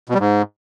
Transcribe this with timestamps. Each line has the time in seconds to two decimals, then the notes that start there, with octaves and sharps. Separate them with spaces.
0.09 B2
0.15 G3
0.20 G#2